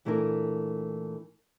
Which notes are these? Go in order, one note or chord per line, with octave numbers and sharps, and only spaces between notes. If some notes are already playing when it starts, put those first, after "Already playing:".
A#2 E3 A3 D4 E4 A#4